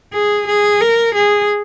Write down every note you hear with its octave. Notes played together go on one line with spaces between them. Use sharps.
G#4
G#4
A#4
G#4